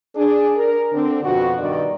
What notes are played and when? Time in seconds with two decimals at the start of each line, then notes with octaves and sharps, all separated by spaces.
0.16 D4 G#4
0.56 A#4
0.92 D3 C4 D4
1.23 F2 B2 F3 F#4
1.59 G2 B2 D#3 A#4 D5